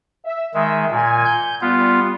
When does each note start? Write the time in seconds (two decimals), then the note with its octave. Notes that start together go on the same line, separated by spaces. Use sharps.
0.24 E5
0.54 D#3 G#3 E5
0.92 A#2 G#5
1.26 G6
1.61 G3 B3 F4